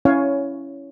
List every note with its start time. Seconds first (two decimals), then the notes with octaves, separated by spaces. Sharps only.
0.05 C#4 E4 C#5 F5 G#5